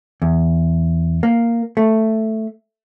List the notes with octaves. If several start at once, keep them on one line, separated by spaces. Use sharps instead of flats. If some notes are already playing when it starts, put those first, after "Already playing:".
E2
A#3
A3